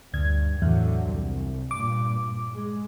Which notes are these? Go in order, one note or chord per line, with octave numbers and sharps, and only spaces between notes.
D2 G2 G#6
E2 A2 D3 F#3
C2
G2 A#2 D6
G#3